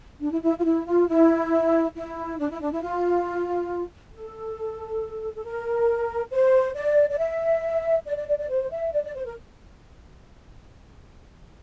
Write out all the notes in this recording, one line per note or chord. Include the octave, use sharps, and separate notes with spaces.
D4
E4
E4
F4
E4
F4
E4
E4
D4
E4
D4
E4
F4
A4
A4
A#4
C5
D5
D5
E5
D5
D5
D5
D5
C5
E5
D5
D5
C5
A#4